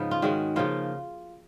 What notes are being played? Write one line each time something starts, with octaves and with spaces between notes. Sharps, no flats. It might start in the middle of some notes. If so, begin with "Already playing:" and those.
Already playing: G#2 C#3 F3 B3 D#4
F4
D#3 G#3 C#4 F#4
C#3 F3 A#3 F4